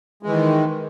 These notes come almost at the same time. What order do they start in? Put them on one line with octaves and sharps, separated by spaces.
G#3 E3 D#3